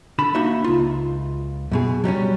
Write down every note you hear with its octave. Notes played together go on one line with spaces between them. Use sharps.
D3 A5 B5
A#3 D#4 F#4 E5
C#2 F4
F#2 B2 G#4
F#3 G3 C4 C#4